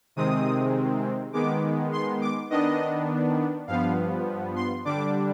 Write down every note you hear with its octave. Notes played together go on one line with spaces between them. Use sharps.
C3 D#3 G#3 C4 D#6
D#3 G#3 B3 D6
C6
D6
D#3 B3 D4 D#5
G2 F3 B3 F5
C6
D3 G3 D4 D6